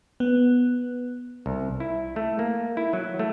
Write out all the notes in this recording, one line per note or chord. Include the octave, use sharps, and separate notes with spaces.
B3
C2
E4
A3
A#3
E4
F#3
A3